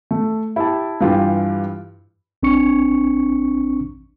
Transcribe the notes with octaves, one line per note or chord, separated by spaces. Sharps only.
A3
E4 G4 A5
G2 E3 F4 G4
A1 C4 D4 C#6 C#7